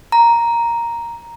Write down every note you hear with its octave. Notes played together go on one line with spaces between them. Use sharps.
A#5